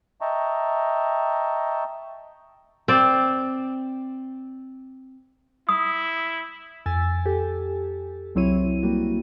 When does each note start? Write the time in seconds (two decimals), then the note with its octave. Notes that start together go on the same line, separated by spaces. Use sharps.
0.21 D#5 E5 G5 A5 A#5 C#6
2.88 C4 D5
5.69 E4 D#6
6.86 F2 G#5 E6 A6
7.26 G4 A4
8.35 C2 F#3 C4 E4 C#5 D#7
8.83 G3 A#3 F#4